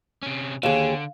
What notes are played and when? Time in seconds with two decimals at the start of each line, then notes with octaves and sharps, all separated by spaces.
0.23 C3 C#4
0.63 D#2 D3 G#4 F5 E7